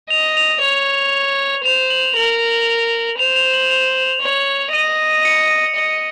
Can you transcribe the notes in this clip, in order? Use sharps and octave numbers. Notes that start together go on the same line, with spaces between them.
D#5 F7
F7
C#5 F7
C5 F7
F#7
A#4 F#7
C5 F7
F7
F#7
F7
C#5
D#5 D#7
C#7
D#5